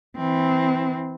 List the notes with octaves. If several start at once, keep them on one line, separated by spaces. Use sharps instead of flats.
E3 C4